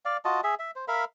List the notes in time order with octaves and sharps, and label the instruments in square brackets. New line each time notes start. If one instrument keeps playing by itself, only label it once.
[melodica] D5 F5
F4 F#4 D#5 A5
G#4 E5
E5
C5
A#4 E5 F5 B5